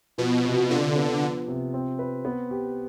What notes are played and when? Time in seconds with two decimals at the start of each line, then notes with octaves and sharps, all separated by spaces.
0.18 B2 F3
0.44 C3
0.70 D3 F4
0.96 B3
1.22 F3
1.48 C3
1.74 C4
1.99 B4
2.25 B3
2.51 G4